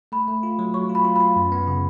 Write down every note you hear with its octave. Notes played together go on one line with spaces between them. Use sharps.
A3 B5
A3
F4
F#3
F#3 C#6
F4
B5
F4
F4 B5
F#2
B3
C#3